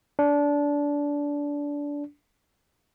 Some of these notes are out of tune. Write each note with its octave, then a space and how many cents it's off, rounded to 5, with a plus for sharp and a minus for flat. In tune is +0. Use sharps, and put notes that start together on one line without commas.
D4 -20